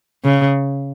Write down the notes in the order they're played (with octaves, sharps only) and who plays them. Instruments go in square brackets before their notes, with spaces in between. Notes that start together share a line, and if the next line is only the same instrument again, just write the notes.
[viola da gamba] C#3